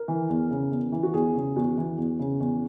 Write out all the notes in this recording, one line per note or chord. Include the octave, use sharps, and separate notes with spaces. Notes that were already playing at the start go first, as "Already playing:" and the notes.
Already playing: A#4
E3
E2
C#3
E2
E3
F#4
E2 G#4
C#3
E2 F#4
E3
E2
C#3
E2